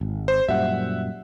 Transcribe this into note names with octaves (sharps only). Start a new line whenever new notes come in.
G#1
C5
F#2 A#2 G3 E5 F#5